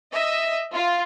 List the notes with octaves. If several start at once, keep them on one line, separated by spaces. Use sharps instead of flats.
D#5 E5
F4